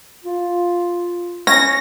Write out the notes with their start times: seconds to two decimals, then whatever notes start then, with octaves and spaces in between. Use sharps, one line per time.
0.24 F4
1.47 C#4 A#6